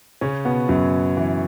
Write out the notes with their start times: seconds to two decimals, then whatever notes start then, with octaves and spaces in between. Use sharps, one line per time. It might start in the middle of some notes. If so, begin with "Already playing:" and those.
0.21 C#3 C#4
0.45 B2 B3
0.69 F#2 F#3
1.17 E3